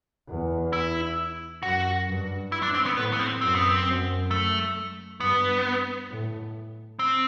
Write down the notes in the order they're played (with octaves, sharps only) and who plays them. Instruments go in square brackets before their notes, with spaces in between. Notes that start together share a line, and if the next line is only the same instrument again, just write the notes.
[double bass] E2
[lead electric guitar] E4
[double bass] F#2 [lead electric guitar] F#4
[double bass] G2
[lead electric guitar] E4
D4
C4
B3
[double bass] A2 [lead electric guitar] B3
[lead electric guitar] B3
C4
[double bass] F#2 [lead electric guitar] C4
[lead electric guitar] B3
C4
[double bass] F#2
[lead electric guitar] A3
[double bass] G2 [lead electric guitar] B3
[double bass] A2
[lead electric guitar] C4